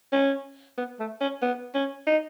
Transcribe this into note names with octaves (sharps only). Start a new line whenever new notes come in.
C#4
B3
A3
C#4
B3
C#4
D#4